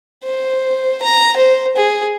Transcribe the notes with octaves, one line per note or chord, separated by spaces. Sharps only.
C5
A#5
C5
G#4